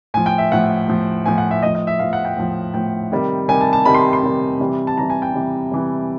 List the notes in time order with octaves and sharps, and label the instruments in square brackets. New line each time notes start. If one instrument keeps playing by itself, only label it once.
[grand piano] A2 F3 G#5
G5
E5
A2 F3 F#5
A2 F3
A2 F3 G#5
F#5
E5
A2 F3 D#5
D#5
E5
A2 F3 F5
F#5
G5
A2 F3
A2 F3 G5
C3 D#3 G3
C3 D#3 G3 G#5
A5
A5
C3 D#3 G3 B5
C6
C6
C3 D#3 G3
C3 E3 G3
A5
C3 E3 G3 A#5
G#5
G5
C3 E3 G3
C3 E3 G3